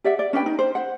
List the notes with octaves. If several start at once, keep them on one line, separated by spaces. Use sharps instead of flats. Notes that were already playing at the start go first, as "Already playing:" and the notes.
G4 D5 E5 F#5
D5
C#4 D4 B4 G5
D#4
C5
C5 F#5